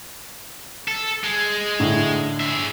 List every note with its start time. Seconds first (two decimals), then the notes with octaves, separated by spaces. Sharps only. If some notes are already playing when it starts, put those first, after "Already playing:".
0.88 A4
1.24 G#3
1.80 A2 D3
2.40 G#4 E5